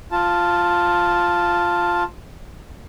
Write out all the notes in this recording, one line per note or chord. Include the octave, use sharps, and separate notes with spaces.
F4 A5